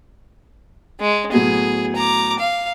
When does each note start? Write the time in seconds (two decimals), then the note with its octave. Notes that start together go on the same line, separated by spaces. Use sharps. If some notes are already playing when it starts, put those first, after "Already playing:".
1.00 G#3
1.32 A2 F#3 B3 G#4
1.96 A#5 D6
2.39 F5